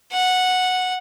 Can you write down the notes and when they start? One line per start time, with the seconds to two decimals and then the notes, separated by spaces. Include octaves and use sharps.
0.12 F#5